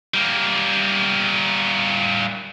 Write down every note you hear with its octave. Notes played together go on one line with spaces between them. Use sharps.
G3 A#3